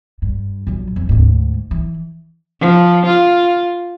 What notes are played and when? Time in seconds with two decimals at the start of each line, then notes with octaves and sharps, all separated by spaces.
0.22 G2
0.67 A#1 F#3
0.96 F2
1.09 D2 G#2
1.71 E3
2.60 F3
3.06 F4